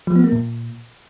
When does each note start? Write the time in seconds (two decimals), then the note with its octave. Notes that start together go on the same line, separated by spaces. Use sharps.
0.07 F3
0.16 B3
0.24 A#3
0.32 A#2